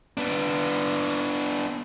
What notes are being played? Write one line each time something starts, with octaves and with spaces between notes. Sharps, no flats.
B3 D4